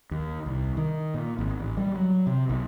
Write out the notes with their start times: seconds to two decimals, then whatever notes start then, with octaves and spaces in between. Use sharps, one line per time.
0.11 D#2
0.46 C2
0.77 D#3
1.14 A#2
1.39 G#1
1.59 A1
1.77 G3
1.96 F#3
2.27 C3
2.50 B1